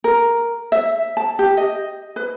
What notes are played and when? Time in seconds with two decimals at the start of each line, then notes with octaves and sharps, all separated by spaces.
0.04 A#4
0.72 E5
1.17 A5
1.39 G4
1.57 D#5
2.16 B4